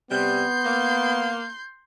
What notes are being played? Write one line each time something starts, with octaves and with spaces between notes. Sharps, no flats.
C3 G3 B3 C6 G6
A#3